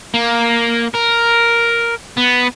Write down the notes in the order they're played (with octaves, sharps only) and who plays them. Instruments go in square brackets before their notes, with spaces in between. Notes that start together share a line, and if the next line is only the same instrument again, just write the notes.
[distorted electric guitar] A#3
A#4
B3